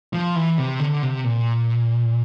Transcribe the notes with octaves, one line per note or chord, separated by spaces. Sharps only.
F3
E3
C3
D3
C3
A#2